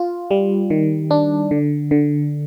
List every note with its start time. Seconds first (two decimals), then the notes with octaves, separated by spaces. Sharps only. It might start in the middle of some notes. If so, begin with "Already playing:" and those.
Already playing: F4
0.31 G3
0.70 D#3
1.11 D4
1.51 D3
1.91 D3